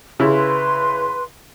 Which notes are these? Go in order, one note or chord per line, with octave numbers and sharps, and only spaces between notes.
C#3 E4 B4 C6